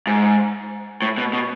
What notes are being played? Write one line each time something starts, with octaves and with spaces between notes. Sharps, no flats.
G#2
A2
B2
B2